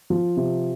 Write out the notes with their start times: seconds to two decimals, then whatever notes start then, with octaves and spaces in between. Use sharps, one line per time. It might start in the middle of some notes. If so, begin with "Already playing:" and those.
0.10 F3
0.37 C3